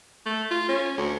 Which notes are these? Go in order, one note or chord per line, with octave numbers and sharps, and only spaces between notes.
A3
F4
C#4
D2